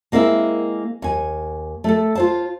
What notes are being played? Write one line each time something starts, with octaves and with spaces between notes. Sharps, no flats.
G#3 A#3 C4 E4 E5
D#2 G#5
A3 A4
F4 C5 A5